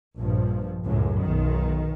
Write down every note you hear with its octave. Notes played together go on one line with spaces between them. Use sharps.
A#1 G2 F3
C#2 F#2 A2
B1 D#3